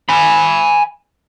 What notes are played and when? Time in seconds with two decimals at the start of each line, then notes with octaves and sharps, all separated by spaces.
0.09 G#5 B5